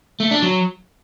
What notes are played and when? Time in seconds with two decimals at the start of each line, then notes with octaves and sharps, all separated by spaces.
0.20 A3
0.31 D4
0.42 F#3